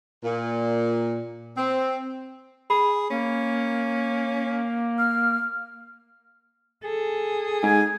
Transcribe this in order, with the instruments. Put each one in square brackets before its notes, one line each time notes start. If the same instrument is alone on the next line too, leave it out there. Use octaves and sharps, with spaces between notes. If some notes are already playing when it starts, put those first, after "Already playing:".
[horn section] A#2
C4
[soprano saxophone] G#4 [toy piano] B5
[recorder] A#3 [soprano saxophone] C#4
[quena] F6
[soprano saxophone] G#4 [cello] A4
[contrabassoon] G#2 [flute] G#5